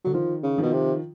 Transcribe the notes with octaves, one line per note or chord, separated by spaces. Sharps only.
D3 F#3
D#3 F3
C#3
B2 D#3 F3
C3